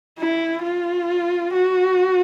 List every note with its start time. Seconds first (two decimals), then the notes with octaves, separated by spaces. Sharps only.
0.19 E4
0.63 F4
1.53 F#4